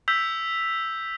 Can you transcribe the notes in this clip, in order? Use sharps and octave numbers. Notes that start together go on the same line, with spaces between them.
E6 G6 B6 F7